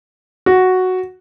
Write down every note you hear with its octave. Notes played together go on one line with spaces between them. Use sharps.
F#4